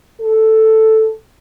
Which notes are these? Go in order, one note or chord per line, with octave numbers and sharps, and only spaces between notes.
A4